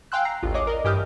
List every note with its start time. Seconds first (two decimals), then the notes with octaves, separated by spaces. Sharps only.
0.12 F5 G5 G#5 C6 E6 F#6
0.25 A#5 C7
0.43 A1 D#2 F4
0.54 G#4 C#5 D#5 D6
0.67 A#4 D5 D#5
0.84 G2 E3 G4 D#6 F6 G6